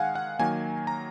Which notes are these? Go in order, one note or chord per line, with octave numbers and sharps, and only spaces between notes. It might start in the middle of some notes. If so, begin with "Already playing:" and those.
Already playing: D#3 G#3 F5 F#5 G#5
F#5
D#3 F#3 A#3 G#5
A#5